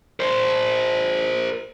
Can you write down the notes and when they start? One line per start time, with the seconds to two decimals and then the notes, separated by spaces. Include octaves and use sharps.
0.20 A#4 C5